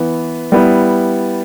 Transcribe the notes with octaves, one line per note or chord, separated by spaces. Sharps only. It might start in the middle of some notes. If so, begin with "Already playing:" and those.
Already playing: E3 B3 E4
G3 B3 E4